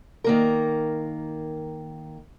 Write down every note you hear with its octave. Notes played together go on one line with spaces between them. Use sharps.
D#3 A#3 A#4